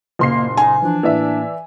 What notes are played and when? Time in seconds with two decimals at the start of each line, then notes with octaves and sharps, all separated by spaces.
0.19 F#1 A#2 A#3 C6 C7
0.57 D#4 G#5
0.82 E3 F3 D4
1.03 A2 E3 A#3 D5 E5